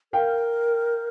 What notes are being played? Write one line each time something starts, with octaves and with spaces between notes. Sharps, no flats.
A#4 F5 G5